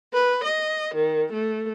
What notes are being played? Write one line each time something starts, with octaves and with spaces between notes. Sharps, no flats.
B4
D#5
D#3
A3